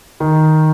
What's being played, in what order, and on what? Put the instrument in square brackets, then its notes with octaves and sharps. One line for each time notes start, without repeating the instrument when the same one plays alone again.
[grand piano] D#3